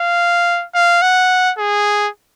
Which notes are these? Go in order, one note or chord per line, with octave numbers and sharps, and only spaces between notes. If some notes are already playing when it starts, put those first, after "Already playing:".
Already playing: F5
F5
F#5
G#4